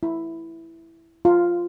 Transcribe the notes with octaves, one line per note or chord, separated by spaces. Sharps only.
E4
F4